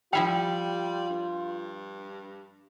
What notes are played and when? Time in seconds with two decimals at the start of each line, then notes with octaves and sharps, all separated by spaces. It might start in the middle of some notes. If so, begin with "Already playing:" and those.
0.13 F3 G3 E4 F4 F5 G5
1.10 G2